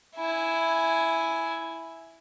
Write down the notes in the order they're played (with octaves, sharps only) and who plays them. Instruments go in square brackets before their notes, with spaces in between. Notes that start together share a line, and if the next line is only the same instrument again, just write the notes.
[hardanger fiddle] E4 G#5